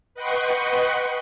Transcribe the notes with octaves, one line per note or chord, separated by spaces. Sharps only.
B4 D#5 F#5 G5 C6 C#6